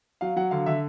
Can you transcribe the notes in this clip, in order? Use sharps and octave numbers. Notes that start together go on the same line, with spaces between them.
F#3 F5
F#3 F#5
D3 F5
D3 E5